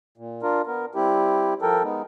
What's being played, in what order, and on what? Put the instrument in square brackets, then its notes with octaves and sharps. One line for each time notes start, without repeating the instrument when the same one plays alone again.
[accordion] A#2
D4 F4 A#4
B3 A#4
G3 C4 E4 G4
F3 A4 A#4 G5
G#3 B3 D#4